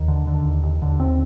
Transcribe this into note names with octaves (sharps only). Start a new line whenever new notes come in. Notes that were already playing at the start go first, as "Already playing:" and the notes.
Already playing: D#2 D#3
D3
D3
D#2
D#2
D#2 D3
D#2 C4